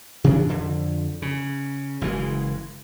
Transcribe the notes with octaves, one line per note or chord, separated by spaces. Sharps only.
C3 E3 F#3 D4
F2 D3
C#3
F#1 C#3 E3 G#3